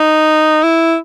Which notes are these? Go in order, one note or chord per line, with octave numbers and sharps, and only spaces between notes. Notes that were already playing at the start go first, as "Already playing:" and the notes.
Already playing: D#4
E4